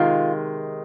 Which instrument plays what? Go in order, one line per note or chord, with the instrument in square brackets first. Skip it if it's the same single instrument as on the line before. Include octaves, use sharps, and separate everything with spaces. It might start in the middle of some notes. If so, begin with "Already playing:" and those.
Already playing: [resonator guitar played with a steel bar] C3 D#3 G#3 F4